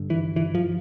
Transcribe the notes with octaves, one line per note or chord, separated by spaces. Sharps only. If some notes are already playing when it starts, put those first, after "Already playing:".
Already playing: G2 D3
E3
E3
F3